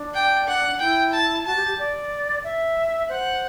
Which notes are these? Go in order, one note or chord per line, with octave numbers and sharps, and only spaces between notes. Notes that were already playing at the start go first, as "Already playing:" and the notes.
Already playing: D4
G5
F#5
E4 G5
A5
F#4 A5
G4
G4
D5
E5
C5 F#5